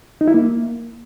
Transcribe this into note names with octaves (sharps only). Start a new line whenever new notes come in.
D#4
E4
A#3